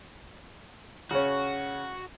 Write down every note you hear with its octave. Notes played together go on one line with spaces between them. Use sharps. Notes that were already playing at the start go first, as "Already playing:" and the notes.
C#3 C#4 F#4